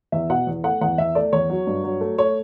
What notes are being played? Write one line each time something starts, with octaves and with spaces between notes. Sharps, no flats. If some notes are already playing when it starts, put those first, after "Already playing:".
E2 E5
B2 F#5
E2
A3 F#5
E2 F#5
E2 E5
A3 D5
E2 C#5
F#3
G2
F#3
A3
A3 C#5